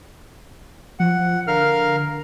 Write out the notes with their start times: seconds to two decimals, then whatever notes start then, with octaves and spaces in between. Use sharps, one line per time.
1.00 F3 F#5
1.47 D3 A#4 F5 F6